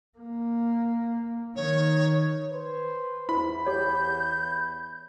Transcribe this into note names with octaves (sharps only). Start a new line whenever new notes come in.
A#3
D#3 C#5
B4 C5
E2 E4 B5
G4 C#5 G6